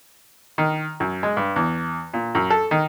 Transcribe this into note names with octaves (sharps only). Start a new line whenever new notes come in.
D#3
F#2
G#3
G2
E2
A#2
F#2
A4
D#3